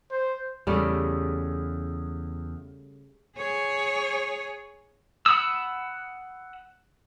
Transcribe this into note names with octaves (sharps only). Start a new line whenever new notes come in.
C5
E2 C#3 G3 A3
G#4 C#5
F#5 B5 D#6 E6